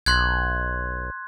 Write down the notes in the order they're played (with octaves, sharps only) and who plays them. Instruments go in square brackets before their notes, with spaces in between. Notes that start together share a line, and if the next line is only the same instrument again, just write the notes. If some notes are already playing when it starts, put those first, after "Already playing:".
[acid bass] B1 [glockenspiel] C6 F#6 G#6